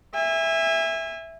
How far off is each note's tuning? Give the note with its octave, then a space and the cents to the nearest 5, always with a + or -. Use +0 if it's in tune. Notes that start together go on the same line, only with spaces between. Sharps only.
E5 +0 G#5 -30